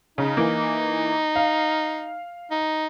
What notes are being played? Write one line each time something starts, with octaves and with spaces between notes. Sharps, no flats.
C#3 D#4
E3 A#3
F5
D#4